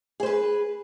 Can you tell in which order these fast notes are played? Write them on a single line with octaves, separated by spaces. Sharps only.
G#4 C5 B4